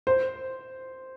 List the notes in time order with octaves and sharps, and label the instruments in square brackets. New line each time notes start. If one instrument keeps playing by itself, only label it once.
[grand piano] C5